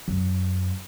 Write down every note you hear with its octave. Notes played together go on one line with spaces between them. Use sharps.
F#2